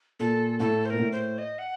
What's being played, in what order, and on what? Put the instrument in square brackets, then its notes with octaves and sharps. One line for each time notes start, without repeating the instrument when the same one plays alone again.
[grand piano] A#2 [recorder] A4
[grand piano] A2 [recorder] A4
[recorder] C5
[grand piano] A#2 [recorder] A#4
[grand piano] A2
[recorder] C5
D#5
F#5